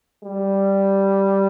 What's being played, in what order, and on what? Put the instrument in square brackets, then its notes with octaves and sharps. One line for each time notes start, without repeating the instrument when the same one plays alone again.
[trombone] G3